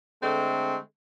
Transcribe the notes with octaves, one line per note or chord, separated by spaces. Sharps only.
D3 G#3 A3 C4